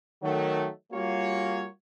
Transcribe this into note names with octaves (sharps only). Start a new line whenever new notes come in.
D#3 F#3 A3
G3 A#3 C#4 F4 F#4 C#5